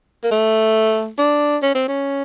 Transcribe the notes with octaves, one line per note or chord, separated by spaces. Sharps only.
A#3
A3
D4
C#4
C4
C#4